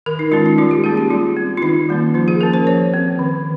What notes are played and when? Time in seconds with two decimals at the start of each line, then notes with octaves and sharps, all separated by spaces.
0.06 D#3 A#4
0.19 D#4
0.31 G#3 C#4 F4
0.46 D#4
0.58 G3 F4
0.71 G4
0.84 A#3 C#4 G#4
0.97 G4
1.10 G3 F4
1.37 C4
1.57 F4
1.62 D#3 D#4
1.89 G3 A#3 C#4
2.14 F3 F4
2.28 G#4
2.40 A#3 C#4 A#4
2.53 C5
2.67 F3 C#5
2.94 C4
3.19 D#3